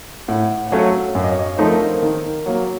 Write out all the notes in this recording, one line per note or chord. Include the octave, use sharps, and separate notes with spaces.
A2 F#5
F#5
F#3 A3 C#4 F5
F#2 F5
D#5
C#5
D#5
F3 A3 D#4 C5
A#4
C5
D#3 A#4
F#3 A#3